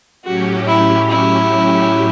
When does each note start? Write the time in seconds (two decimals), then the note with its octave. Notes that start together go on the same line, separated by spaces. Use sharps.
0.24 A2 F#3 C#4 F#4 G4
0.67 E4
1.10 E4